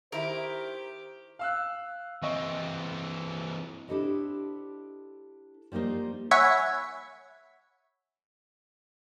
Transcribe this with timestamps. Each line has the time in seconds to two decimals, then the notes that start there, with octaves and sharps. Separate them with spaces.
0.12 D#3 E4 G4 A#4 C5
1.39 F5 E6 F#6
2.23 E3 C4 D#5 C#6
3.88 D4 E4 G4 A4 C5 D#5
5.72 F3 G3 A#3 D#4 C5
6.31 C#5 E5 F#5 G#5 B5